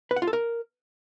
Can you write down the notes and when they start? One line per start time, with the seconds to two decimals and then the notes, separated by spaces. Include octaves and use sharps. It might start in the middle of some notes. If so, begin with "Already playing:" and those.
0.11 B4
0.16 F#5
0.22 F4
0.27 A4
0.33 A#4